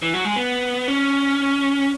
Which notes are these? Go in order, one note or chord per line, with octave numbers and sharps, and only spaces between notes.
E3
F#3
G#3
B3
C#4